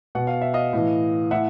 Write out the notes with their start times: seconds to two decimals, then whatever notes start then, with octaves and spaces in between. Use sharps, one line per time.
0.15 B2 F#5
0.27 F5
0.42 E5
0.54 D#5 F5
0.73 A2 E3
1.31 A2 E5 F#5